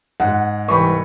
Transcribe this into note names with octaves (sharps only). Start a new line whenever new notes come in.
G#2 F#5
C2 E3 G5 B5 C#6